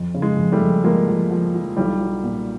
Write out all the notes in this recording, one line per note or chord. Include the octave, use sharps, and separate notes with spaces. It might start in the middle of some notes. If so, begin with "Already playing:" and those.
Already playing: F2
C#3
G#3
F2
G3 A3
F2
F3 G#3 A#3
F3
F3
F3
B1 G3
F#3
A#2